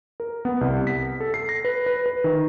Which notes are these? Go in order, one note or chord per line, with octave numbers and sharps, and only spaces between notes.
A#4
B3
C2
B6
A4
C7
A#6
B4
B4
B4
D#3